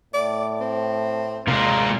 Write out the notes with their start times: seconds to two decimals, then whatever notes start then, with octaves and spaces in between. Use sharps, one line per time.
0.14 A2 D5
0.60 C4
1.48 C3 G#3 F4 A#4